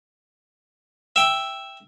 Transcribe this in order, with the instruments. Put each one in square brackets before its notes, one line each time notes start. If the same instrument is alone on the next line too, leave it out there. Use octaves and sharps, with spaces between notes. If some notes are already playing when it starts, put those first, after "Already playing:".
[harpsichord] E5 G5